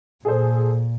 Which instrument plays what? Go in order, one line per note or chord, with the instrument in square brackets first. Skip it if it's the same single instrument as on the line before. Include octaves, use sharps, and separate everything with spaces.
[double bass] A#2 [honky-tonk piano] G#4 A4 C5